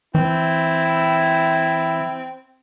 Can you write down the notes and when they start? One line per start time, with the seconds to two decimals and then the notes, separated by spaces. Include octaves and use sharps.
0.15 E3 C4 E4